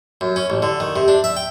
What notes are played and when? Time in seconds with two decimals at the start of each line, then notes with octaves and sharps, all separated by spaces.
0.21 F#2
0.36 C#4
0.50 A1
0.62 D3
0.80 D#3
0.96 C3
1.08 D4
1.24 E5
1.37 G5